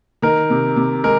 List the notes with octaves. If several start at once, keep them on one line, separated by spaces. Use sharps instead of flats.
D#3 A#4
C3
C3
G#3 A#4